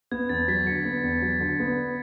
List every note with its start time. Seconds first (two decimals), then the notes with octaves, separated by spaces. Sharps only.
0.12 B3 G#6
0.29 E2 A6
0.48 F#3 B6
0.67 D3 C#7
0.85 B3
1.03 E2
1.22 F#3
1.40 D3
1.60 B3